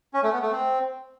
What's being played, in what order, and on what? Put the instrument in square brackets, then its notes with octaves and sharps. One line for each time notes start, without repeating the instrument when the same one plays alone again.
[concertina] C#4
A3
B3
A3
C4